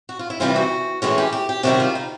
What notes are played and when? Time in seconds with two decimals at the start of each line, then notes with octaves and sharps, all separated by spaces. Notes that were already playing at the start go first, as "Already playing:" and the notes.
0.09 F#4
0.19 F4
0.30 E4
0.40 C3 E3 G3 C4 F4
0.56 F#4
1.02 A2 E3 G#3 C#4 F#4
1.18 G4
1.33 G4
1.49 G4
1.63 C3 D#3 G3 C4 F#4
1.80 F4
1.95 D#4